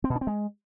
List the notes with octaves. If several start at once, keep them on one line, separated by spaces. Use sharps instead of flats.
C4
B2
D4
C4
G#3